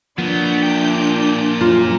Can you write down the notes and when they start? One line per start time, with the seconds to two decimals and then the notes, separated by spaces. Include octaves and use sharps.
0.18 F3 F#3 A#3 B3 D4 G6
0.63 A#2 G5
1.61 F#2 F4